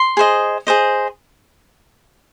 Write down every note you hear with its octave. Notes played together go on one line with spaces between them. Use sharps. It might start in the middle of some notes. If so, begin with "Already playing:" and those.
Already playing: C6
G#4 C5 D#5
G#4 C5 D#5